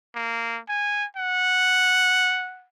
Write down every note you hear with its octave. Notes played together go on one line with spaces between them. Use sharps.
A#3
G#5
F#5